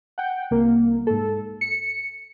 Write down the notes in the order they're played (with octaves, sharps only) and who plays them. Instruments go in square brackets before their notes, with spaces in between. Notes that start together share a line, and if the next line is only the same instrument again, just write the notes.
[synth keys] F#5 G5
C2 A#3
G#2 A4
C#7